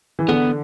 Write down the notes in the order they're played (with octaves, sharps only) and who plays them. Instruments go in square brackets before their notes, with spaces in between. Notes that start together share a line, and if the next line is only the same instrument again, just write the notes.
[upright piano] E3
[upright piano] D3 [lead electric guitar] B3